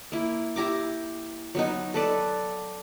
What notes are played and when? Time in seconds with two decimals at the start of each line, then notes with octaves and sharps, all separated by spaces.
0.12 A#3 E4
0.56 E4 G4 A#5 D6
1.55 F#3 B3 D#4
1.94 A4 B4 D5